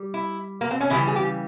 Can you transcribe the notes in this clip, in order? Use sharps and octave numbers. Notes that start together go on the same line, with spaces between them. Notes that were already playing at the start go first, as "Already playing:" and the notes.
Already playing: G3
E4
A#3
C4
C#4
C#3 E3 G3 E4
G#4
G4